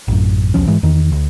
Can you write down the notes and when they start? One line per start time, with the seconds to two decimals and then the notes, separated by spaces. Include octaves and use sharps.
0.08 A1 F#2
0.54 B1 E2 F3 C#4
0.67 G#2 E3 G#3
0.83 E2 D#3
1.12 D2